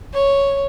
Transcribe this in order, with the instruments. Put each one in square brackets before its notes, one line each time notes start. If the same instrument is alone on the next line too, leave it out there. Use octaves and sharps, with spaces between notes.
[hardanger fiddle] C#5